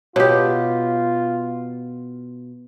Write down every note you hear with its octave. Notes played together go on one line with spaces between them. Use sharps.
B2 F4 G4 C#5 G5